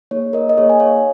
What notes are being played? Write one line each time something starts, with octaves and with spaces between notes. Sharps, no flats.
A#3 D#4 G#4 C#5
A#4 D#5
D#5
A#3 D#4 G#4 C#5
G#5
C#5 F5